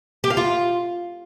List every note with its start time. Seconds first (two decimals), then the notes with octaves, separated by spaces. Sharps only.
0.24 G4
0.30 F5
0.37 F4